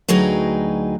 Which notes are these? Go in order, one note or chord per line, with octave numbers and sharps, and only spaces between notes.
D2 F#3 D#4 G#4 B4 G5